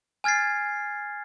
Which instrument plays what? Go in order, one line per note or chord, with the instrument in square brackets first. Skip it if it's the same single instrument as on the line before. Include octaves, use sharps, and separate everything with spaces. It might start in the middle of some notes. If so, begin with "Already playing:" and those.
[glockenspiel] G#5 F6 G#6 A6 C7